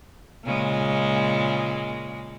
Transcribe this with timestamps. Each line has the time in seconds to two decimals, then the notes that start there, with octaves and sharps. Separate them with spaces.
0.44 A#2 C#3 G#3